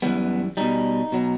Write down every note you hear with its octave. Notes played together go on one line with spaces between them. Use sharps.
F#2 E3 G3 B3
B2 G3 D#4
B2 F#3